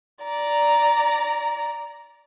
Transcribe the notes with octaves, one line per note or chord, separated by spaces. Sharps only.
D5 A#5